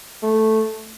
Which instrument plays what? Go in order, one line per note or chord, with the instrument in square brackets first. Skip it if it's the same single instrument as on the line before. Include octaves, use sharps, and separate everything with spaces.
[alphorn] A3